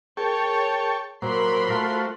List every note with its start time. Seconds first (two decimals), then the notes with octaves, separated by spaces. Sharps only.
0.17 G#4 A#4 C#5 G5 A5 C#6
1.22 A#2 F#3 A#4 C5 B5 C6
1.70 A3 F4 F#4